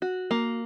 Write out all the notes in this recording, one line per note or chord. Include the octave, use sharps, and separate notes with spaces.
F#4
A#3